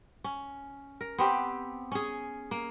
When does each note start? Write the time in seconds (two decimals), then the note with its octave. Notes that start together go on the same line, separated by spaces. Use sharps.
0.24 C#4
1.01 A#4
1.18 B3 C4 G4
1.92 C#4 G#4
2.51 A#3